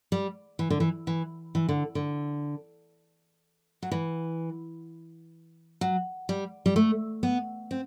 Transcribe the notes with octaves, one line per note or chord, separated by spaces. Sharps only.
G3
E3
D3
E3
E3
E3
D3
D3
F#3
E3
F#3
G3
G3
A3
B3
C4